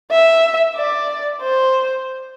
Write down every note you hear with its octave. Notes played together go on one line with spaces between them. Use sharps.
E5
D5
C5